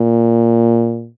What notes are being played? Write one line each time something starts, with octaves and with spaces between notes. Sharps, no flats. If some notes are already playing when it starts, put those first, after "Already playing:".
Already playing: A#2